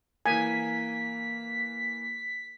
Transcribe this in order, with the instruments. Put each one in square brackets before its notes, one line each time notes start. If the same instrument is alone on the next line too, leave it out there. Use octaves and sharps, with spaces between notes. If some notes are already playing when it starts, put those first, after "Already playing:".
[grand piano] E3 A#3 [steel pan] G#5 [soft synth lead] B6